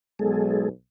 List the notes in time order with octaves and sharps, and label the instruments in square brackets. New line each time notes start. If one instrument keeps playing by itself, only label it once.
[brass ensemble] B1 [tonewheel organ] G#3 G#4 A4